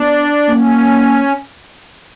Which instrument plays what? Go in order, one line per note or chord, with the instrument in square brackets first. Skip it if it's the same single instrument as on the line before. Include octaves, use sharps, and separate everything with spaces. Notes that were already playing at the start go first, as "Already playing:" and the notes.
Already playing: [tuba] B3 [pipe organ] D4
[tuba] A#3 [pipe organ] C#4